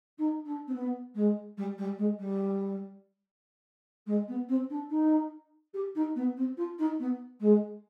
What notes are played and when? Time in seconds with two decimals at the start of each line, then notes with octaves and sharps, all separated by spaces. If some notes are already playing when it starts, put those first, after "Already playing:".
0.18 D#4
0.45 D4
0.67 C4
0.74 B3
1.15 G#3
1.57 G3
1.78 G3
1.98 G#3
2.19 G3
4.06 G#3
4.28 B3
4.48 C4
4.69 D4
4.89 D#4
5.73 G4
5.95 D#4
6.15 B3
6.36 C4
6.57 F4
6.78 D#4
6.99 B3
7.40 G#3